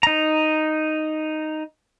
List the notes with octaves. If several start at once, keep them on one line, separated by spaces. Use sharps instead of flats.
D#4 A#5